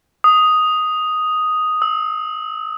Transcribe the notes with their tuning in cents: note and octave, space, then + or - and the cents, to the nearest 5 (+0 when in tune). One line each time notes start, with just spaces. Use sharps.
D#6 +0
E6 -25